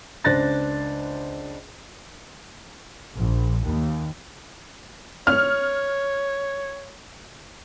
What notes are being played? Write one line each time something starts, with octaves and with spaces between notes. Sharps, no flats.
C#2 D4 C5 F#6 A6 A#6
A#1
D#2
C#5 F6